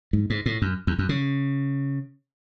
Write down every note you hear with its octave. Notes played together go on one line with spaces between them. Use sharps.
G#2
G#2
A2
F#2
E2
F#2
C#3